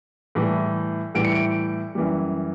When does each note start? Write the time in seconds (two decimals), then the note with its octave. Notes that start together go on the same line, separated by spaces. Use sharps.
0.35 A2 E3 G3
1.15 A2 E3 G3 D7
1.24 C#7
1.35 D7
1.95 F#2 E3 G3